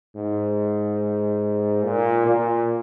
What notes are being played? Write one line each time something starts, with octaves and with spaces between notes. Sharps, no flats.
G#2
A#2
A#2